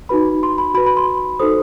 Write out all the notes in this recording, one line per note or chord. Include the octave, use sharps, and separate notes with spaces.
D#4 F#4 B4 B5
C6
B5
F#4 B4 B5
B5
C6
D#4 F#4 A4 C5 D#6